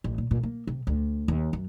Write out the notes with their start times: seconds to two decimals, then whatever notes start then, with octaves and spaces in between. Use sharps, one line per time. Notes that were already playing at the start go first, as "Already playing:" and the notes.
0.04 A1
0.18 A#2
0.31 A#2
0.43 A#3
0.67 C3
0.87 D2
1.28 D#2
1.53 F#2